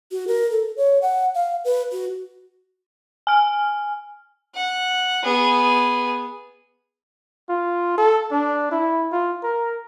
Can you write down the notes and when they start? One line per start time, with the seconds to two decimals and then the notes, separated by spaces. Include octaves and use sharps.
0.12 F#4
0.28 A#4
0.51 A4
0.77 C#5
1.02 F#5
1.35 F5
1.65 B4
1.92 F#4
3.27 G#5 F6
4.55 F#5
5.23 B3 G#4
7.49 F4
7.98 A4
8.31 D4
8.71 E4
9.12 F4
9.43 A#4